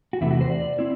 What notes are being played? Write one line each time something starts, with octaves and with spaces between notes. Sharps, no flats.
F#4
E2 C3 E3 A3 E4
F#4
C5
D5
C4 E4